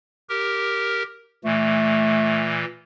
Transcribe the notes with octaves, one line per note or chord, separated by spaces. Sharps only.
G4 A#4
A#2 E3 A3